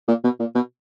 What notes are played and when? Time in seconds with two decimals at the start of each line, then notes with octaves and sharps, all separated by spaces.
0.08 A#2
0.24 B2
0.40 A#2
0.55 B2